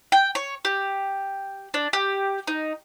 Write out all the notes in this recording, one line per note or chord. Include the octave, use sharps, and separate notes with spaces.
G5
C#5
G4
D4
G4
D#4